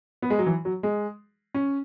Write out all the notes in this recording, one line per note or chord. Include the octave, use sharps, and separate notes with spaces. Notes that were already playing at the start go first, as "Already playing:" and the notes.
B3
G#3
F#3
E3
F#3
G#3
C#4